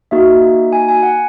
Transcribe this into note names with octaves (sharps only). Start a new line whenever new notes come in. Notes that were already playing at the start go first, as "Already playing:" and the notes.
A#3 D#4 F#4 E5
G#5
G#5
F#5